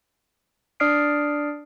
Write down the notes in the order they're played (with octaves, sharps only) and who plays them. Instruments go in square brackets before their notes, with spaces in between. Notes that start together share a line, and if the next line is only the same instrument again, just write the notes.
[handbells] D4 D5 D#6 F6 C7 D7